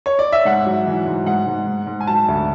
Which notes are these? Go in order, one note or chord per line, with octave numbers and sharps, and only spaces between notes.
C#5
D5
E5
G#2 F#5
F#3
E3
G#2
G#2 F#5
G#2
G#2
G#2
G#5
F#3 A5
D2